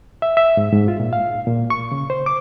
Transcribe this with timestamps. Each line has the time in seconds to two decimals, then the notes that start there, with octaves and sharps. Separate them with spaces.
0.22 E5
0.37 E5
0.57 G#2
0.73 G#2
0.88 F4
1.00 A#2
1.13 F5
1.47 A#2
1.70 C#6
1.92 C#3
2.10 C5
2.26 D6